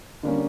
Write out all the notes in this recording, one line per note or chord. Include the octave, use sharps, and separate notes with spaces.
D3 G3 A#3 C#4